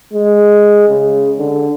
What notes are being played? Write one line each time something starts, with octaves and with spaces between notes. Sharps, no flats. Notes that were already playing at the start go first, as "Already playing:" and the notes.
G#3
C#3
D3